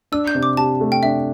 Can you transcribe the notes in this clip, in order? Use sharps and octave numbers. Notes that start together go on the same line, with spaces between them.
D4 E6
G6
C3
D6
G4 A5
A3
G5
D4 E5